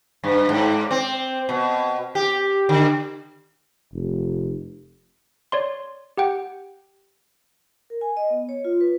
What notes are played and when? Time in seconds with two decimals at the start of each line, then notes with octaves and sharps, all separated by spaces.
0.24 G2
0.49 G#2
0.91 C4
1.49 B2
2.15 G4
2.69 D3
3.93 F1
5.52 C#5 D5 C6
6.17 G4 F#5 G5
7.90 A#4
8.01 G#5
8.17 D#5
8.30 B3
8.49 C#5
8.64 F4
8.81 B4